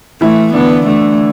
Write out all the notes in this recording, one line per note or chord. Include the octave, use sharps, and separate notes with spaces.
E3 A3 E4
D3 B3 D4
D3 A3 D4